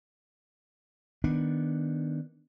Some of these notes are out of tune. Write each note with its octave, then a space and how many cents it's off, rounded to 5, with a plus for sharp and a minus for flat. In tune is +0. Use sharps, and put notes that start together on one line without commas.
D#3 +5 B3 +0 D4 +0